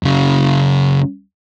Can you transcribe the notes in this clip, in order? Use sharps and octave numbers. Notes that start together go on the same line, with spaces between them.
F#2 C#3